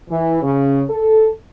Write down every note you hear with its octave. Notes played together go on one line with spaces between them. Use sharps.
E3
C#3
A4